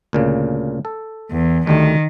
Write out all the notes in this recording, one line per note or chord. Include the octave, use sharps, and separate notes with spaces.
D2 A#2 C#3
A4
E2
D2 D#3 G3 A3